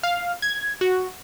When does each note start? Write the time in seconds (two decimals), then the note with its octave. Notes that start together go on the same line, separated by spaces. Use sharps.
0.03 F5
0.42 G#6
0.81 F#4